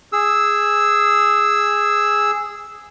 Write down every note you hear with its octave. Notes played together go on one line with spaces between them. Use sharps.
G#4 E6